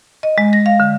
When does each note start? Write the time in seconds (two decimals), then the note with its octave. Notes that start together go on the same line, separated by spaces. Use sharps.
0.23 D#5
0.38 G#3
0.53 A#6
0.66 F5
0.80 D3